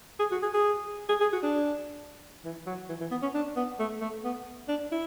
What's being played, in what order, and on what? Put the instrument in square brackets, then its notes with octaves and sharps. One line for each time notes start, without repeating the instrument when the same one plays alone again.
[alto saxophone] G#4
F#4
G#4
G#4
G#4
G#4
F#4
D4
E3
F#3
E3
E3
B3
C#4
D4
B3
A3
A3
B3
D4
E4